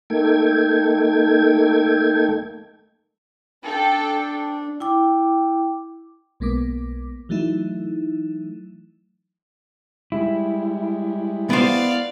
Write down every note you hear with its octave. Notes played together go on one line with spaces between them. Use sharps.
A3 A#3 D#4 A4 G5 G#6
D4 A4 G5 A5
E4 G5 D6
B1 G#3 A#3 B3 D6
E3 F#3 A3 D#4 E4
G3 G#3 E4
B3 C5 D5 F5